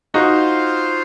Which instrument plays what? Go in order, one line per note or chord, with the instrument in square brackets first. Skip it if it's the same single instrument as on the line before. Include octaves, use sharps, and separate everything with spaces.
[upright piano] D#4 F#4 [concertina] F4 C5 F5